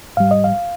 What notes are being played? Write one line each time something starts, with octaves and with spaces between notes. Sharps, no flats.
G#2 G3 F5
D#5
F5